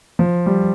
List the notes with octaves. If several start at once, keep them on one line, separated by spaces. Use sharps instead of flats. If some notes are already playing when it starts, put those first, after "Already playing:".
F3
G3